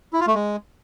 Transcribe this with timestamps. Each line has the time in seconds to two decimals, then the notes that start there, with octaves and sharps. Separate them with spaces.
0.13 E4
0.20 F4
0.27 A3
0.35 G#3